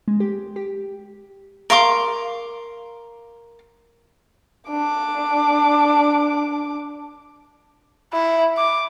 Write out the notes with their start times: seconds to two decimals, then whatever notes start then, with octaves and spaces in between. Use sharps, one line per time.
0.08 G#3
0.20 G4
0.56 G4
1.70 A#4 F5 C6 D6
4.70 D4 D6
8.13 E4
8.57 D6